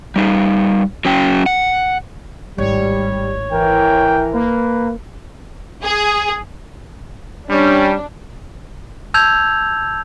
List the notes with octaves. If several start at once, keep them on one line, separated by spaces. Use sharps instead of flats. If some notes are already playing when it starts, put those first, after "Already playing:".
G3 D#4
F#3 C#4 G5
F#5
G#1 A2 G3 C#5
E3 A#4 G5
A#3 B4
G#4
G3 C#4 D4
A5 E6 G6 G#6 F7